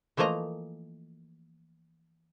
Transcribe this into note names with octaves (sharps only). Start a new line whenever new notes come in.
E3 F3 A3 A#3 D#5 A#5